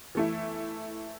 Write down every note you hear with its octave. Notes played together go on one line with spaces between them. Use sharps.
E3 A3 E4